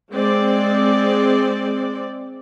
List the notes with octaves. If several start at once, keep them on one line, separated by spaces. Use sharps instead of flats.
G#3 C4 D5